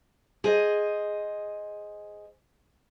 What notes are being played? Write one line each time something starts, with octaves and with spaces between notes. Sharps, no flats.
G#4 C5 D#5